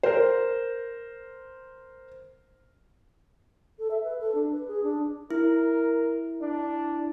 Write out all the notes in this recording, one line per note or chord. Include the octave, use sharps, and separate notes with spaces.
A#4 C5
A4
E5
B4
A4
D4
B4
G#4
D4
E4 A#4
D4